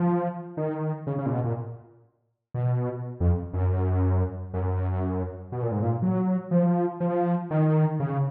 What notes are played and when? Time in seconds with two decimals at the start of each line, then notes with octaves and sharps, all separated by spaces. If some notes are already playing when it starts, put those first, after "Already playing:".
Already playing: F3
0.57 D#3
1.07 C#3
1.18 C#3
1.26 A#2
1.32 B2
1.44 A#2
2.54 B2
3.20 F2
3.53 F#2
4.54 F#2
5.52 B2
5.63 A#2
5.71 G#2
5.82 A#2
6.02 F#3
6.51 F3
7.00 F3
7.51 D#3
8.00 C#3